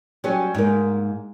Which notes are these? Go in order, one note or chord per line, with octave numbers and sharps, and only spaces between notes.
F#3 G3 C#4
G#2 A#3